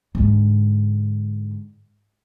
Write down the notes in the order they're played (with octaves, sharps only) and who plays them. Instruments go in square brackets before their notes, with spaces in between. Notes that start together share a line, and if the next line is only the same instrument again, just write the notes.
[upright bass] G#2 D3